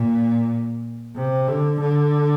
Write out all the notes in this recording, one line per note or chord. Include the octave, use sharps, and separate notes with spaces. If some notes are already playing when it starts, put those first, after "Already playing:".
Already playing: A#2
C3
D3
D3